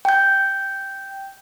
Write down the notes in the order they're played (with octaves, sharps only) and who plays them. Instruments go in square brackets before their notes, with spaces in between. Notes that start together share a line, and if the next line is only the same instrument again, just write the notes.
[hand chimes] G5 G6